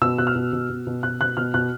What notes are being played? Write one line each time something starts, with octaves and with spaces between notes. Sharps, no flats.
B2 E6
B2 F#6
F6
B2
B2
B2
B2
B2 F#6
B2 F#6
B2 F6
B2 F#6